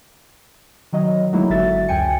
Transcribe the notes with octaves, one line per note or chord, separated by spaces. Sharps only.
D#3 F#3 D#5
D3 F#3 G#3 A#3 D#4 E4
G1 D3 F#4 E5 A6
C#2 F#2 G5 G#5 C#7